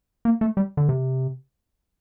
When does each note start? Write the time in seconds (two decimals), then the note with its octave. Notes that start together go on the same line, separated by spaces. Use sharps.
0.25 A#3
0.41 A3
0.57 G3
0.77 D3
0.89 C3